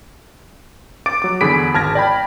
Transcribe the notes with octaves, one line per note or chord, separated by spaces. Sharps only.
D6 A6 D7
F#3 D6
E2 D3 G#4 B5 B6 D7
G#1 A5 F6 G#6 A#6
D5 G5 B5